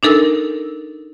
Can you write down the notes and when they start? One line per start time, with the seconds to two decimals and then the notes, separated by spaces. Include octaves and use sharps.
0.03 D4 D#4 A4 A#4 E6